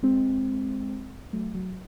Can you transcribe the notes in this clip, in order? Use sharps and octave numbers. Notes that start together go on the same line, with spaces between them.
G#3 C4
F#3 A3
F#3